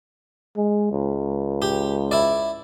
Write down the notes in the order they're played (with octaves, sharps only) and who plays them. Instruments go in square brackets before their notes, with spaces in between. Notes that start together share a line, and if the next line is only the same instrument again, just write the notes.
[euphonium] G#3
C#2
[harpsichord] G4
E4 D5